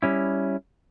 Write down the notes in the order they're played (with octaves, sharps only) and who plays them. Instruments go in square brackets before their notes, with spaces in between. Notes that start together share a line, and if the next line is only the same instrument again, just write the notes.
[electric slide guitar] G3 C#4 E4